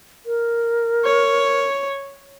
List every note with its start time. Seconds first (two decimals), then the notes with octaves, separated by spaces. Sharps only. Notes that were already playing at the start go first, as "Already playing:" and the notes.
0.26 A#4
1.05 C#5